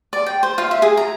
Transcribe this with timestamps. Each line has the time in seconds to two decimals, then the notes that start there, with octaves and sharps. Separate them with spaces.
0.13 D5
0.26 G5
0.43 C5
0.58 F4
0.71 E5
0.82 G#4
0.97 A#5